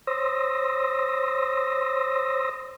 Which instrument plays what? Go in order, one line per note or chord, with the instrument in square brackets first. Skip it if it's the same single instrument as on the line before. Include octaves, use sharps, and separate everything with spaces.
[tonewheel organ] C5 C#5 C6 D#6 E6 A#6